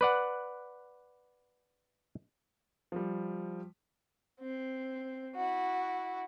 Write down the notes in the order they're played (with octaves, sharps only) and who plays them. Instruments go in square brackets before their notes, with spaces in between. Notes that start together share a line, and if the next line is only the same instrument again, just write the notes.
[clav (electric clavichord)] B4 D5 F#5
[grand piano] F3 G3
[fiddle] C4
E4 F#4